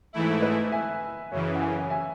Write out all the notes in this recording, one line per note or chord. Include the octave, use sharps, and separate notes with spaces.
G#2 E3 A3 E4
B4 D#5
E5 G#5
F#2 C#3 E3 C#5 E5
F#5
E5 G#5
E5 G#5